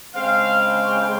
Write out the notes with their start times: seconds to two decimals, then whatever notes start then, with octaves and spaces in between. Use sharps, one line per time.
0.14 C#3 G#3 C4 F5
0.61 F5